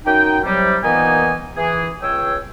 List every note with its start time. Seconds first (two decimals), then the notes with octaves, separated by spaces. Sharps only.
0.06 F#2 D#4 G5
0.45 C3 F#3 G3
0.84 A#2 D#3 E3 B3 D#4 G#5
1.57 E3 G#4
2.03 C#2 C#5 G5 E6